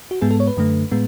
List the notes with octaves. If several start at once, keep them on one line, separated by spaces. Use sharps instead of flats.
F#4
G#2 G#3 B3 G#4
A4
C#5
B4
F#2 D3 A3
A2 G#3 B3